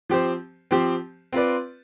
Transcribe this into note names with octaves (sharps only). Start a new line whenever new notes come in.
F3 C4 G4 C5
F3 C4 G4 C5
C4 F4 B4 D5